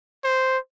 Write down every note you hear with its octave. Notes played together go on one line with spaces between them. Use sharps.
C5